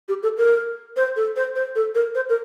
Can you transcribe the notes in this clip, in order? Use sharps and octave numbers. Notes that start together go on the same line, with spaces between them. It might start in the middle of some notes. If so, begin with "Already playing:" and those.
G4
A4
A#4
C5
A4
C5
C5
A4
A#4
C5
A#4